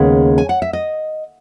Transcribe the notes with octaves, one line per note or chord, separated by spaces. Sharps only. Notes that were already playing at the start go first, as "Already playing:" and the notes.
Already playing: D#2 C#3 G#3 B3 C#5
G#5
F#5
E5
D#5